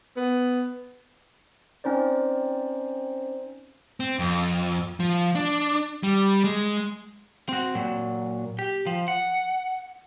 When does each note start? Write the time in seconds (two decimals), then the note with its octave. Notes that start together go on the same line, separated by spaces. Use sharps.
0.16 B3
1.84 C4 C#4 D#4 C5 D5
4.00 C4
4.19 F2
5.00 F3
5.35 D4
6.03 G3
6.44 G#3
7.49 C4 F#4
7.75 A#2 F#3
8.59 G4
8.87 F3
9.08 F#5